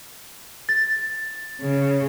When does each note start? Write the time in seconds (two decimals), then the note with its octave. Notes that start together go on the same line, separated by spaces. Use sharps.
0.69 A6
1.62 C#3